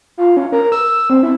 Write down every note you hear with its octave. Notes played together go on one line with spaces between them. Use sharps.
F4
C#4
A#4
E6
C4
E4